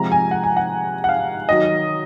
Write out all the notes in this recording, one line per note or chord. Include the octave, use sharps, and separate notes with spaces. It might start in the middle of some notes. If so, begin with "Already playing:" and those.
Already playing: C3 F3 G#3 A#5
G#5
F#5
G#5
F#5
F#5
F5
D#3 F#3 D#5